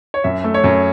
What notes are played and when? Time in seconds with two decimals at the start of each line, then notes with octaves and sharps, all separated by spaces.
0.14 C#5
0.24 F#2 E5
0.44 A3
0.54 C#5
0.64 F#2